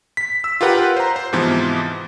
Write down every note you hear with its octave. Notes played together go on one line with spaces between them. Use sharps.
B6
E6
F4 G4 A#4 B4 F#5 G5
C5 A#5
C5
G#2 C3 E3 F3 B3